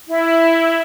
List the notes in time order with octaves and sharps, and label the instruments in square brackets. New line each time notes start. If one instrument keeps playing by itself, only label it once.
[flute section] E4